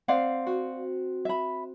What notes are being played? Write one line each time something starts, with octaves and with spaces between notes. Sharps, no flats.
C4 D5 F5 F#5
F#4
E5 B5